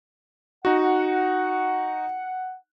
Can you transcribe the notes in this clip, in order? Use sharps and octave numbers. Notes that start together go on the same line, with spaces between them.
D#4 F#4 F#5